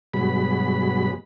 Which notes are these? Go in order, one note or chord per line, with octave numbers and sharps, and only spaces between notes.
G2 B2 F#3 G#3 B5